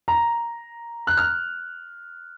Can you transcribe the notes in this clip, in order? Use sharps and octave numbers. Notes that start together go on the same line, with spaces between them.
A#5
F#6
F6